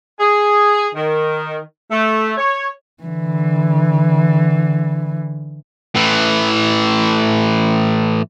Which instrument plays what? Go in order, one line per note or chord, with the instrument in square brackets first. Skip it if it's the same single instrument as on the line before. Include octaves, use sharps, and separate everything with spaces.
[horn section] G#4
D#3
A3
C#5
[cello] D3 E3
[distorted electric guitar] A2 E3